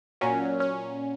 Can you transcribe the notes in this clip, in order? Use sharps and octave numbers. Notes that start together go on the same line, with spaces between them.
A#2 F#3 C#4
C#4